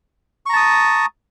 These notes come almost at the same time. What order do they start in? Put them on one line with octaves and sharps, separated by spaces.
C#6 A#5 A5 D#6